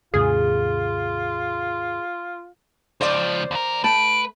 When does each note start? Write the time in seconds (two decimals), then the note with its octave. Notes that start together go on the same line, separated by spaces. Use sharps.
0.14 D#2 G#2 C3 F4 G#4
3.01 C#2 F3 C5 D5
3.51 D#2 A#4
3.84 A3 B4 A5 D7